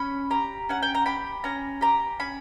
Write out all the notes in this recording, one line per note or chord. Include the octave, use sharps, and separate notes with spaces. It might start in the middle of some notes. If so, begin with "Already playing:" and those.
Already playing: C#4 B5
G4 A#5
C#4 F#5
G5
A#5
G4 B5
C#4 A#5
G4 A#5
C#4 B5